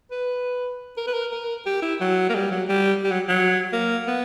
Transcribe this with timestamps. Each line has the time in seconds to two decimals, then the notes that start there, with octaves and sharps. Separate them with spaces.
0.11 B4
0.97 A#4
1.07 B4
1.14 A#4
1.32 A#4
1.66 G4
1.82 E4
2.01 F#3
2.29 A#3
2.35 G3
2.51 F#3
2.69 G3
3.04 G3
3.11 F#3
3.29 F#3
3.73 A#3
4.07 B3